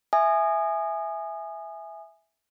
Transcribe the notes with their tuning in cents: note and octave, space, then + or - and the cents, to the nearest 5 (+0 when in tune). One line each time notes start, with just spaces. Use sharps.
E5 +0 G#5 +0 D#6 -30